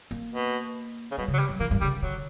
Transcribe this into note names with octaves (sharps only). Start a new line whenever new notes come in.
A#3
B2
C#3
B2 G3
C#3
F#3
G3
F#3
E3 A#3
G2
C#3 G3
D3
D3 F#3